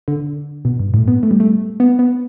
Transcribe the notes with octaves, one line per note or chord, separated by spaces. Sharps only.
D3
B2
G2
A2
B3
A3
G3
A3
B3
B3